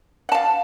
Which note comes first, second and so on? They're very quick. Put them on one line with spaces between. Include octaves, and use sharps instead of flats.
F#5 A5 F5